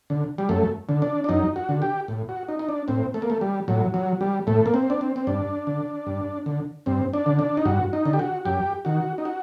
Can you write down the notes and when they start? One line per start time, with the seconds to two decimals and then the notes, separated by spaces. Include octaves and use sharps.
0.10 D3
0.38 G3
0.49 F#2 A3
0.89 D3
1.02 D4
1.24 D4
1.29 F#2 D#4
1.56 F#4
1.69 D3
1.82 G4
2.08 A2
2.29 F#4
2.48 D#4
2.59 D#4
2.69 D4
2.88 A2 C4
3.14 A3
3.22 A#3
3.30 A3
3.41 G3
3.68 A2 F#3
3.94 F#3
4.21 G3
4.47 A2 A3
4.66 A#3
4.74 C4
4.90 D4
5.01 C4
5.16 C4
5.27 G2 D4
5.67 D3
6.07 G2
6.46 D3
6.86 G2 C4
7.13 D4
7.26 D3
7.39 D4
7.57 D#4
7.65 G2 F#4
7.93 D#4
8.05 D3
8.13 G4
8.19 F#4
8.45 F#2 G4
8.85 D#3 F#4
9.18 D#4
9.25 F#4